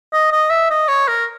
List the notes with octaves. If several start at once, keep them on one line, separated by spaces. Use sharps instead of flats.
D#5
D#5
E5
D#5
C#5
A#4